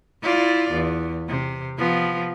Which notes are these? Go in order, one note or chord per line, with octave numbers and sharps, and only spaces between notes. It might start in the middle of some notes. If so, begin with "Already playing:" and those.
E4 F4 D5
E2
C3
F3 B3